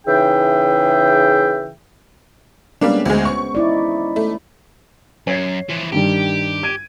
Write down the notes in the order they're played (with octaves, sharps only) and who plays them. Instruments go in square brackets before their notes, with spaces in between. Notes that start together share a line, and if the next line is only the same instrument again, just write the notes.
[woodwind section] C#3 E3 D#4 G#4 E5 G5
[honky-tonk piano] G3 A#3 D4 [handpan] G#3 B3 C#4
[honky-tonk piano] D2 G#3 [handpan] C5
[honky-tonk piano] C#6
[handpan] D#4 E4 D5
[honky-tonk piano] A3
[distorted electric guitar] F#2 [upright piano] C#5 G#6 C7
[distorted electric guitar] E3 F3
[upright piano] G2 D#3 G3 [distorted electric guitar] G4
[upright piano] G#6 D7 D#7